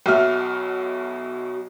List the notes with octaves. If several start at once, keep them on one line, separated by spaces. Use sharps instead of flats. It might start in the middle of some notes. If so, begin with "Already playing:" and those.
B1 B2 E5 F6